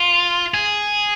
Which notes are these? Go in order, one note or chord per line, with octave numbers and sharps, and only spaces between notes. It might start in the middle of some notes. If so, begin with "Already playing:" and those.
Already playing: F4
G#4